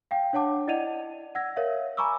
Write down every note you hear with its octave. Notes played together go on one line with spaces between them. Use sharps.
F5 G5
D4 C#5 F#5 A5 D6
E4 D5 D#5 F#5 D#7 F7
F#5 E6 G#6 A#6
A#4 C#5 E5 F5
G#5 A#5 B5 C#6 D6 E6